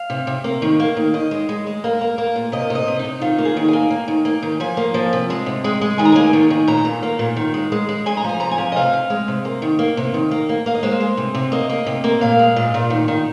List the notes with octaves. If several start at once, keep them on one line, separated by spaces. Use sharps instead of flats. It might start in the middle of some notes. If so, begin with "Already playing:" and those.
Already playing: F5
C3
C3
A#3
D#3
A#3
D#3
D#3 D#5
G#3
G#3
G#3
A#3
A#3
A#3
A#2
C3 D#5
C3 D#5
C3
D#4
C3
D#3 F4
A#3
G#4
D#3
A#3 G#5
A#3
D#3
A#3
D#3
F3 G#5
A#3
F3
C3
G#3
C3
G#3
G#3
D#3 G#5
A#5
A#3 G#5
D#3
D#3
A#2 A#5
A#2
A#3
A#2
D#3
G#3
G#3
G#3
G#3 G#5
A#5
F3 G#5
C3 A#5
G#5
F3
D#5
C3 F5
C3
G#3
C3
A#3
D#3
A#3
C3
D#3
A#3
A#3
A#3 F5
D#5
G#3 C5
G#3
C3
C3
A#3 D#5
A#3
C3
A#3
A#2 F5
G#3
A#2
A#2
D#3
D#3